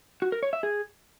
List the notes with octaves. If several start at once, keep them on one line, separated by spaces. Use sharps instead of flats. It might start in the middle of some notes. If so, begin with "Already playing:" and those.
F#4
A#4
C#5
E5
G#4